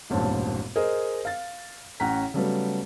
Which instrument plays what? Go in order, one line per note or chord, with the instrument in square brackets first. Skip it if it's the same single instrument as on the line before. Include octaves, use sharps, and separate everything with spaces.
[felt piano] E1 A1 G2 A#2 C4 A5
G#4 A#4 C5 D#5
F5 A6
A1 C#4 F#5 G5 A#5 B6
C#3 F#3 G3 A3 B3